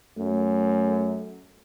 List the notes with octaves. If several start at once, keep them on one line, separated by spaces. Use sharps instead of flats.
F#2 A3